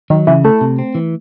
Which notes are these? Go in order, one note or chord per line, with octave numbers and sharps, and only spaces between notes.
D#3 F#3
C#3 E3
A3 E4
C3
C4
E3